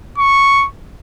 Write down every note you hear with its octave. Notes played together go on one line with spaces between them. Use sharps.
C#6